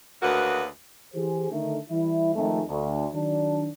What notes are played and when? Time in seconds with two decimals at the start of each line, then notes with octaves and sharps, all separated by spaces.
0.22 D2 C#3 A#3 F#4 B4
1.14 E3 G4 G#4 C5
1.50 D3 D#3 A3
1.89 E3 G3 E4
2.35 F2 D#3 G#3 A3
2.69 D2
3.12 D#3 F#3 D4